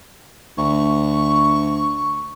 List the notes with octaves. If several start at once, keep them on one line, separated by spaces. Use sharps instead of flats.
D2 C#6